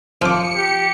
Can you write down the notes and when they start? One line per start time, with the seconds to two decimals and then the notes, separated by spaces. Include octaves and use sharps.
0.22 F2 F3 D6 C#7
0.55 G4